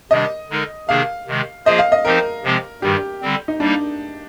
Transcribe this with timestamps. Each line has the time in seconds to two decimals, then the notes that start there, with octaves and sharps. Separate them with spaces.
0.11 C3 D#3 G3 D4 G4 D#5
0.50 D3 G#3 D#4 A#4
0.88 C3 D#3 A#3 D4 G#4 F5
1.27 C3 D#3 G#3
1.66 F3 A#3 F4 G#4 C5 D#5
1.79 F5
1.92 D#5
2.05 F3 C4 D#4 G4 A#4 C5
2.44 C3 F3 G#3 C4 G4
2.82 G2 D#3 G3 G4
3.21 D3 G3 C4
3.48 D#4
3.60 G3 A#3 D4 D#4